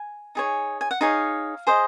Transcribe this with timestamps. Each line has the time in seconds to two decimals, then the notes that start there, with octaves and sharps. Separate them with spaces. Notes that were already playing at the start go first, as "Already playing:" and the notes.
Already playing: G#5
0.35 D#4 G#4 C#5
0.81 G#5
0.91 F#5
1.01 D#4 G#4 C#5 F5
1.67 G#4 C5 D#5